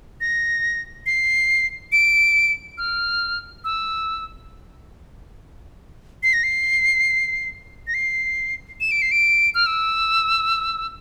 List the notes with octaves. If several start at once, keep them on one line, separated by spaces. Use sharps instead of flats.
A#6
C7
D7
F6
E6
C7
A#6
C7
A#6
C7
E7
D7
C7
D7
F6
E6